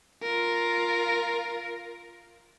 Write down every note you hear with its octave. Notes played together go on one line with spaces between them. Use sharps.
F4 A#4